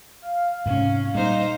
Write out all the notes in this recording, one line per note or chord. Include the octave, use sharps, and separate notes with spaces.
F5
G#2 C3 C#4
A#2 G3 G#3 D#4 C5